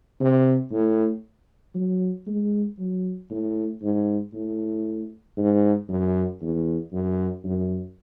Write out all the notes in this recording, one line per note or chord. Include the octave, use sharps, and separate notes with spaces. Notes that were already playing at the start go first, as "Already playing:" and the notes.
C3
A2
F#3
G#3
F#3
A2
G#2
A2
G#2
F#2
E2
F#2
F#2